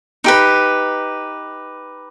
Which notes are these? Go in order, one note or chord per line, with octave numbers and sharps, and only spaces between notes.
D#4 G4 B4